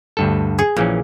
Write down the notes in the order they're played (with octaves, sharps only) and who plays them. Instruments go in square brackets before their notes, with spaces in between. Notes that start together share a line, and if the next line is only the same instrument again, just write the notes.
[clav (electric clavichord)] D2 G2 A4
[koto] G#4
[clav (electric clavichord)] A#1 E3 C#4 [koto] A#2